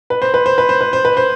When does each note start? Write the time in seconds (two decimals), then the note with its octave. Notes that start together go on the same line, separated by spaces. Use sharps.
0.10 B4
0.22 C5
0.34 B4
0.46 C5
0.58 B4
0.69 C5
0.81 B4
0.93 C5
1.05 B4
1.17 C5